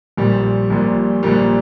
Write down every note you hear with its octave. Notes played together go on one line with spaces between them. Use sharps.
A#1 A#2 G3
A#1 A#2 G3
A#1 A#2 G3